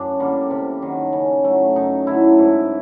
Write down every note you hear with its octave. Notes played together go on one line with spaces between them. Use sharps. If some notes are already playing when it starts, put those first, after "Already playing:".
Already playing: F#2 D4
D3 G3 A#3
C3
D#3 F#3
C#3
F#3 A3
F#2 D#4
D3 F#3 A3 E4
G#2